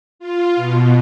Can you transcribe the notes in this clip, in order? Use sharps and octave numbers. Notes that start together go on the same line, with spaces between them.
F4
B2